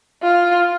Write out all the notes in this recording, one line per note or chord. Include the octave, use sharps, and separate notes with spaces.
F4